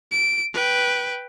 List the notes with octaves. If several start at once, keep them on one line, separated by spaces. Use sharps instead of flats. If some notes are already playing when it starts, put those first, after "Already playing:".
D7
B4 G5